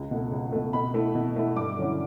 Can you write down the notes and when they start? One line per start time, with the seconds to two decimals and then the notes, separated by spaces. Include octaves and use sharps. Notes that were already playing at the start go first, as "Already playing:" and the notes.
Already playing: C#2
0.11 B2 A3
0.32 C#2
0.52 B2 A3
0.73 B2 B5
0.94 A3 E4
1.15 B2
1.36 A3 E4
1.56 G2 D6
1.77 D3 F#3 C#4 E4